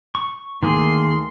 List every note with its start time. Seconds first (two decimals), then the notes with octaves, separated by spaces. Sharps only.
0.15 C#6
0.63 D2 D#3 A#3 G#4 C6